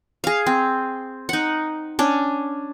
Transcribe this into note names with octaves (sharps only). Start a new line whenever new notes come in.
G#4 F5
C4
D#4 F#5
C#4 D4